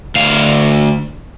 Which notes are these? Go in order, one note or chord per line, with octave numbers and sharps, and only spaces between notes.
D2 F5